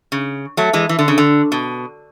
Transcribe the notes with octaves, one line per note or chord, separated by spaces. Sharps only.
C#3
F#3 A3
E3 G#3
E3
D3
C#3
D3
B2